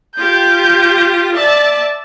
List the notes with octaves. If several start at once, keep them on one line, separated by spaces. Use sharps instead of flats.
F4 G4 G6
D5 E5 A5